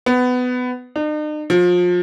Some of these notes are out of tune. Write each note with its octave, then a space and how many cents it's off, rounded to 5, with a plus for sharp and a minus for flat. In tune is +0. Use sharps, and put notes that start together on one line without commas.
B3 +20
D#4 -45
F3 +30